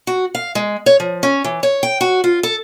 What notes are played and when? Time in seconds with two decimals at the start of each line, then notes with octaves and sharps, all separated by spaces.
0.07 F#4
0.35 F5
0.55 G#3
0.86 C#5
1.00 F3
1.23 C#4
1.44 E3
1.63 C#5
1.83 G5
2.01 F#4
2.24 F4
2.43 A4